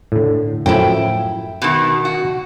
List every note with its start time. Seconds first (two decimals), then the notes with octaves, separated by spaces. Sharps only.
0.12 A2 D3
0.66 F#2 A2 F3 E4 G5
1.62 B2 D#3
2.05 F#4